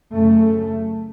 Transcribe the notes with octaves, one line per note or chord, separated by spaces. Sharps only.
F#2 C#3 A3